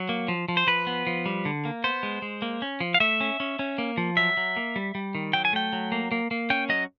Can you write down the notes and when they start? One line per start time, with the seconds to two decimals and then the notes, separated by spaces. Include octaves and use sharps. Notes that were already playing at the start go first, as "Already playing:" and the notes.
Already playing: F#3
0.09 A#3
0.28 F3
0.48 F3
0.57 C5
0.67 F3 B4
0.87 B3
1.07 F3
1.26 G3
1.45 D3
1.65 A#3
1.84 B3 C5
2.03 G#3
2.22 G#3
2.42 A#3
2.62 C#4
2.80 F3
2.94 F5
3.00 A3 E5
3.21 C#4
3.40 C#4
3.59 C#4
3.78 A#3
3.97 F3
4.17 F#3 E5
4.37 F#3
4.56 A#3
4.76 G3
4.95 G3
5.15 D#3
5.33 F#3 G5
5.45 G#5
5.53 A3 G5
5.73 F#3
5.92 A#3
6.12 A#3
6.31 A#3
6.50 C#4 G5
6.69 F#3 D#5